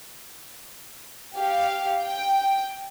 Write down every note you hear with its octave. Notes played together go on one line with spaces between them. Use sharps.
G4 F5
G5